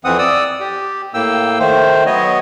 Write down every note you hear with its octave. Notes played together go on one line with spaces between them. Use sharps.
F2 E3 C4 F#5 D#6
D5 D#6 E6
G4
A2 A#3 G5 E6
D#3 A3 C5
F#3 B3 C#5 D#5